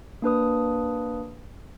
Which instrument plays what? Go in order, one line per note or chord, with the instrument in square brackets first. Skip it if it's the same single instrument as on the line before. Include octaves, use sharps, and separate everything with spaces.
[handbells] A#3 D4 B4 D#6